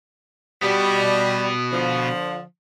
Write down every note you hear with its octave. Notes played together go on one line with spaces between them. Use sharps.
B2 G3 B3
D3 F3